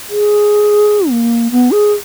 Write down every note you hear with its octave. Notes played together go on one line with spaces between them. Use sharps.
G#4
A#3
B3
G#4